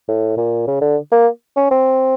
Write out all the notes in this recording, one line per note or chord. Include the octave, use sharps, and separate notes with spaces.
A2
A#2
C#3
D3
A#3
C#4
C4